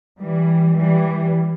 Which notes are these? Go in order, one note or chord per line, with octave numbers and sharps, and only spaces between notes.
E3 G3
E3 G3